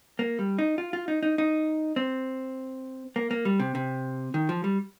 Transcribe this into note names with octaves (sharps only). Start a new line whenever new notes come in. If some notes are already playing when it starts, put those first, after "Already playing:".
A#3
G3
D#4
F4
F4
D#4
D#4
D#4
C4
A#3
A#3
G3
C3
C3
D#3
F3
G3